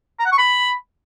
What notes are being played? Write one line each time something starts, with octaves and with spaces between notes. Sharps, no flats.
A#5
F#5
C#6
B5